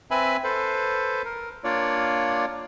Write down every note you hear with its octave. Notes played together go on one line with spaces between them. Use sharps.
C4 B4 E5 G#5 B5
A4 B4 C5
A#4
A#3 D4 F4 C#5 D5